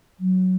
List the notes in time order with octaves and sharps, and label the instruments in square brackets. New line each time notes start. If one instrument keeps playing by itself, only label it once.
[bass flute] F#3